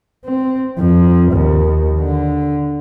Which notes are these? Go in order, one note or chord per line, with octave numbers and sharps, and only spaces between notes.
C4
F2
D#2
D3